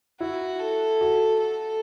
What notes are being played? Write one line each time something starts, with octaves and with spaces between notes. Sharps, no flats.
E4 F#4
A4
F#4
A4